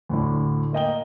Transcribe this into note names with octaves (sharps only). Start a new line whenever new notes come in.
D2 A2 D3
A#3 D#5 G5 G7